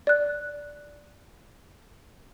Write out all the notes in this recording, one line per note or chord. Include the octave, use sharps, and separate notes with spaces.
D5 F#6